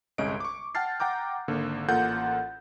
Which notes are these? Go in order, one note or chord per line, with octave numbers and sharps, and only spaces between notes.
G1 C2 G#3 C#4 D#5 D7
C#6 D6
F#5 G5 A5 F6 A6 C7
F#5 G5 A#5 D6 G6
G#1 D3 A#3
A1 A#3 F4 A4 F#5 G6